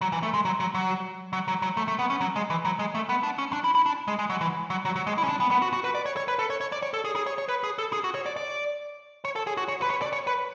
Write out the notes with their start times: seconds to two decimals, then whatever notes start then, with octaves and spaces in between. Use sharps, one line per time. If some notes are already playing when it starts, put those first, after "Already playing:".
0.01 F#3
0.12 E3
0.23 A3
0.34 G#3
0.45 F#3
0.60 F#3
0.75 F#3
1.33 F#3
1.48 F#3
1.62 F#3
1.77 A3
1.88 A3
1.99 B3
2.10 C#4
2.21 F#3
2.36 G#3
2.50 E3
2.65 F#3
2.79 G#3
2.95 A3
3.09 B3
3.23 D4
3.38 C#4
3.53 D4
3.64 E4
3.75 E4
3.86 D4
4.08 G#3
4.19 G#3
4.30 F#3
4.41 E3
4.70 F#3
4.85 F#3
4.96 F#3
5.07 G#3
5.18 E4
5.24 C#4
5.29 D4
5.40 B3
5.51 B3
5.62 F#4
5.73 F#4
5.84 B4
5.95 D5
6.06 C#5
6.17 C#5
6.28 B4
6.39 A4
6.50 C#5
6.61 C#5
6.72 D5
6.82 C#5
6.94 A4
7.05 G#4
7.16 G#4
7.26 C#5
7.38 C#5
7.48 B4
7.64 G#4
7.78 A4
7.93 G#4
8.04 F#4
8.15 C#5
8.26 D5
8.36 D5
9.25 C#5
9.36 A4
9.47 G#4
9.57 F#4
9.68 C#5
9.82 B4
9.90 C#5
10.02 D5
10.13 C#5
10.27 B4